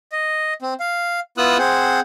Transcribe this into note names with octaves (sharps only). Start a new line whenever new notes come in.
D#5
C4
F5
B3 E4 F4 D#6 E6 F#6
C4 G#4 C5 F#5